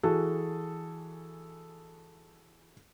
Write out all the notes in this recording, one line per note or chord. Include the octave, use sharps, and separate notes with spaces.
E3 F#4 G#4 A4